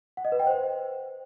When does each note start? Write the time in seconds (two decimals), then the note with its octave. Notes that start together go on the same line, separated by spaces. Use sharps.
0.17 F#5
0.25 D#5
0.32 B4
0.39 G5
0.47 C5